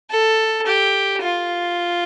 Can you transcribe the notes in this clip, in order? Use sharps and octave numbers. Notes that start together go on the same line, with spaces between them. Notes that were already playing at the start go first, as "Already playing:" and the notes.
A4
G4
F4